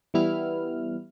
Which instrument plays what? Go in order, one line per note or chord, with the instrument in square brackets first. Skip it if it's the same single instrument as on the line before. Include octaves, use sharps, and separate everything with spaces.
[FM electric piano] E3 G3 B3 E4 F6